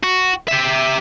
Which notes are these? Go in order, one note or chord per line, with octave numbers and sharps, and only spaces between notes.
F#4
G4 E5